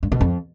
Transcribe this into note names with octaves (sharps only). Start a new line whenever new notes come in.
G2
B2
F2